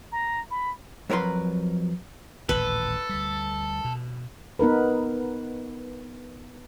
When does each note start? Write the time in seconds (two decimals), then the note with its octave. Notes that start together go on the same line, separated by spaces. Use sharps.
0.12 A#5
0.51 B5
1.10 F2 F#3 A#4 B4 C6
2.49 D#1 A1 A#2 A4 B4
3.09 D2 G3
3.85 B2
4.59 B3 D#4 A#4 B4